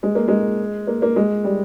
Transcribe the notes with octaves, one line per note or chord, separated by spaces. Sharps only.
G#3
A#3
G#3
A#3
A#3
G#3
G3